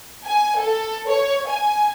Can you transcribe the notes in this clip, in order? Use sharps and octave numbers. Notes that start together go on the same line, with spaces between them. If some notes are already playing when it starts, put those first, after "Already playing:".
G#5
A4
C#5
G#5